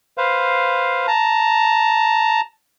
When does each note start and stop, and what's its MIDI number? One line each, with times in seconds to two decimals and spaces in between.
0.18 1.06 71
0.18 1.06 72
0.18 1.06 77
1.08 2.41 81
1.08 2.41 82